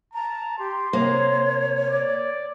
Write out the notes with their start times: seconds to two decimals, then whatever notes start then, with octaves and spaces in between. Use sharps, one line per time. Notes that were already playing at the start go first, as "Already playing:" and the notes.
0.14 A5 A#5
0.59 G4 C6
0.93 C3 A#3 C5 C#5
1.91 D5